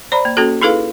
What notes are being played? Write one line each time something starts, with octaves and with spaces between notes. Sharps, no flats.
C5 D5 A#5 B5
A#3
A#3 C#4 F#4 A4
D#4 E4 G#4 A4 B4 F5